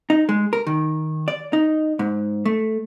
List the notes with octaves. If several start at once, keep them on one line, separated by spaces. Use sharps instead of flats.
D#4
G#3
A#4
D#3
D5
D#4
G#2
A3